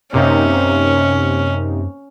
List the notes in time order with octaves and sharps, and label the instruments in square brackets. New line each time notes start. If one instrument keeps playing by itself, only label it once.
[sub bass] F#2 [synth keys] C3 A#3 D#4 [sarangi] C#4